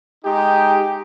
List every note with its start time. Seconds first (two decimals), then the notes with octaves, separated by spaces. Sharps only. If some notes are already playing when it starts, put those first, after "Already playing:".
0.24 G#3 D#4 G4